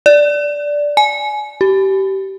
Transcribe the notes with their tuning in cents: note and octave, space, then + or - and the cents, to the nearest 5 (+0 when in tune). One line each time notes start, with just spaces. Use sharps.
D5 -5
G#5 +25
G4 -25